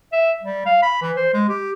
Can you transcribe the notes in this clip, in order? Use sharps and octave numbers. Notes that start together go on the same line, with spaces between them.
E5
G3
F5
B5
E3
C5
G#3
G4